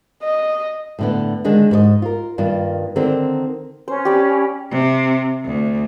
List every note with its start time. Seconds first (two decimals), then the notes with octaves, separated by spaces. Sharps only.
0.23 D#5
0.99 A2 D3 B3
1.44 D3 D#3 G#3 D4
1.71 G#2 A4 D#5
2.02 F4 A#4
2.38 G2 D#3 A#3 F4
2.96 D3 D#3 C4 A4 A#4
3.88 C#4 C5
4.05 G4 D5 B5
4.70 C3
5.45 D2